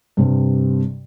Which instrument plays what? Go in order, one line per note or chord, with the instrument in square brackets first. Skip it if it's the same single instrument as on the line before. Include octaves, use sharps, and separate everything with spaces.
[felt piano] G2 C3 G3